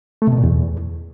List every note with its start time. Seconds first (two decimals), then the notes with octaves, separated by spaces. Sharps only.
0.22 A3
0.27 C3
0.33 B2
0.38 A#2
0.44 E2